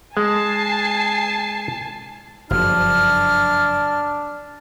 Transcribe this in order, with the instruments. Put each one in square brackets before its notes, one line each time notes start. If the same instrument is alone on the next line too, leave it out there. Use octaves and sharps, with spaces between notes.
[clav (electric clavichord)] G#3 [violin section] G#5 A5 C7
[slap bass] F#1 G2 F3 [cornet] D4 [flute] F6